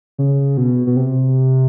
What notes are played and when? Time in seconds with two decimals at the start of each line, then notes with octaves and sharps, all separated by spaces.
0.19 C#3
0.57 B2
0.87 B2
0.96 C3